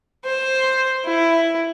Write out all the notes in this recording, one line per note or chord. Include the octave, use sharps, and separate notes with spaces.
C5
E4